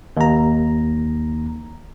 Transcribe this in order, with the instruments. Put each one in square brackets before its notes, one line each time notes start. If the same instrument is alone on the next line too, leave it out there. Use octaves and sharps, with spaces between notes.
[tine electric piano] D#2 A#5